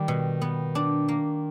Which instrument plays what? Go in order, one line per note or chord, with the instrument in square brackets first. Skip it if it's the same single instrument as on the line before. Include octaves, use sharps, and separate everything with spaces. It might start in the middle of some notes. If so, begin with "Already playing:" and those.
Already playing: [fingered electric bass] D#3 [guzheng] G3
[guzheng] B2
B3
D4
A#3